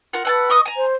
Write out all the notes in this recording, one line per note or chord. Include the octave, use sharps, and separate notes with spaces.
F4 A#4 F#5
B4 F#5 G#5 A5 E6
D#5 C#6 D#6
G#5 A#5
C5